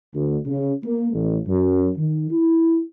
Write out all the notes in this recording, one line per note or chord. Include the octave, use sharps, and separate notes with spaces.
D2
C#3
A#3
A1
F#2
D#3
E4